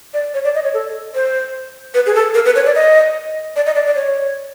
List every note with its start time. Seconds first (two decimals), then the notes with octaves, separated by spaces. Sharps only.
0.14 D5
0.34 C#5
0.44 D5
0.55 D#5
0.64 C#5
0.74 A4
1.15 C5
1.94 B4
2.06 G#4
2.15 A4
2.34 A#4
2.46 B4
2.55 C#5
2.66 D5
2.75 D#5
3.56 D5
3.66 D#5
3.76 D5
3.86 D5
3.95 C#5